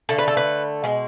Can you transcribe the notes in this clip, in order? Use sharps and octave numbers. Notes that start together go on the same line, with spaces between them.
D3 A3 A4
B4
A4
B4
B2 G#3